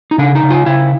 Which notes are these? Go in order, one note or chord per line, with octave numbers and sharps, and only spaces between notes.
D#4
C#3 D4
D#4
C#3
F4
C#3 E4